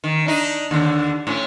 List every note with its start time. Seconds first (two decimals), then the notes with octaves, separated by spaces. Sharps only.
0.04 D#3
0.26 D4 D#4
0.71 D#2 D3
1.27 A2 C#4